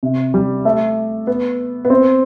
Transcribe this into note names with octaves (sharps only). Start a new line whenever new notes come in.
C3
G3
A3
B3
B3
C4